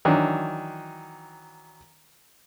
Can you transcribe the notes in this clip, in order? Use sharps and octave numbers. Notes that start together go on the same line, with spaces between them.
D#3 E3 F#3 D4